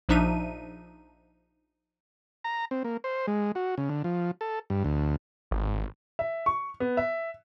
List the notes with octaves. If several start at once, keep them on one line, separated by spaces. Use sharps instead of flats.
A#1 F3 D4 D#4 E5 D#7
A#5
C4
A#3
C5
G#3
F#4
C#3
D3
F3
A4
G2
D2
G#1
E5
C#6
B3
E5